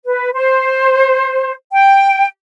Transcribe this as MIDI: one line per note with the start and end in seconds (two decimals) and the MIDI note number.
0.04 0.30 71
0.33 1.52 72
1.72 2.26 79